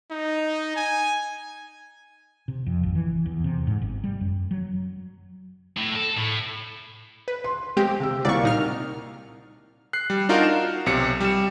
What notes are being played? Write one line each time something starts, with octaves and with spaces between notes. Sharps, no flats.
D#4
G#5
C3
F2
G#1
E3
E2
C3
G#2
G1
G3
F#2
F#3
A2
A4
A2
B4
C6
G#3 C4 G4 G5
C3 E6
C2 C3 A#3 D5 C#6
A#2 D#4 F6
F#6 C7
G3
D4 D#4 F4 F#4 A#4
E7
B1 C3 C#7
G3 E7